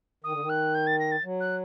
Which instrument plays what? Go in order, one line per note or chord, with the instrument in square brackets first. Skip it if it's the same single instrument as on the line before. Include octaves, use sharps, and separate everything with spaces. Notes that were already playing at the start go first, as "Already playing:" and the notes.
[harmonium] D#3 [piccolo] D#6
[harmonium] D3
D#3
[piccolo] F#6
G6
A6
A#6
A6
[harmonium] F#3
[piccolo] F#6